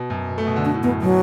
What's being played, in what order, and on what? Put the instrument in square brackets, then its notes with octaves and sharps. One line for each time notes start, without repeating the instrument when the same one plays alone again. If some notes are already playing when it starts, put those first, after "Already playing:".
Already playing: [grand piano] B2
F#2
B2
A3
B2
D3
[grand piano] B2 [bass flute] D4
[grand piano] A2
[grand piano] F#2 [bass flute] B3
[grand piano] B2 [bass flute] F#3